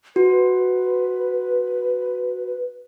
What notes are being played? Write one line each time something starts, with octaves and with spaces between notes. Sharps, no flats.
F#4 B4